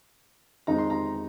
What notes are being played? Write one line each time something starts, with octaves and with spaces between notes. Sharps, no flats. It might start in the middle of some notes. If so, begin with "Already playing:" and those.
F2 D#3 G#3 D#4 A#5
C6
A#5